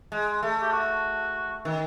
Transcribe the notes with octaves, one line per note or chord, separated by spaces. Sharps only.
G#3
A3
G4
F#4
D#3